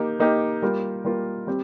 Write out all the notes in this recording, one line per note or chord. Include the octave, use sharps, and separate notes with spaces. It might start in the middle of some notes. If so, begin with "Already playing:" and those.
Already playing: A#3 D#4 G4
A#3 D#4 G4
G3 A#3 F4 A#4
G3 A#3 F4 A#4
G3 C4 G4